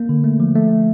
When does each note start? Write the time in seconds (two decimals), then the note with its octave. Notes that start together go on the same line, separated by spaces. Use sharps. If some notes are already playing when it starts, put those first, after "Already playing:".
Already playing: A#3
0.09 D3
0.24 A3
0.40 F3
0.56 A3